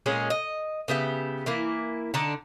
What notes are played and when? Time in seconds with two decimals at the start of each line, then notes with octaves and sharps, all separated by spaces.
0.06 A#2 G#3 C#4 G#4
0.30 D#5
0.88 C#3 B3 G4 E5
1.46 E3 A#3 E4
2.14 D3 D4 D#4 A5